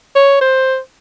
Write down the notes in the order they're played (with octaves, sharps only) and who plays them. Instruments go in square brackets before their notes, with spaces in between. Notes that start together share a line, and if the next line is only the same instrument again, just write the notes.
[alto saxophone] C#5
C5